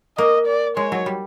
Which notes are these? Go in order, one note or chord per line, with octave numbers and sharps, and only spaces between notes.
A#3 D#5
D5
G#3 C#5
F#3
G3